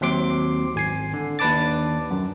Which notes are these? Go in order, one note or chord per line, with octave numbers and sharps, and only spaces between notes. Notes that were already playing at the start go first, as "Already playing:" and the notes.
D#2 F#3 C4 C6 D6 C7
G#1 G#5 C7
D3
D#2 D4 B4 A5 D6 A6
F#2